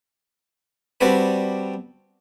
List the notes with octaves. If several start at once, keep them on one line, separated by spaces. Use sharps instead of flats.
G3 C4 D4 F#4 G4 B4